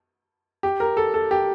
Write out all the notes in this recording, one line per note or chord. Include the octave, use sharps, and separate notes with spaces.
G4
A#4
A4
A4
G4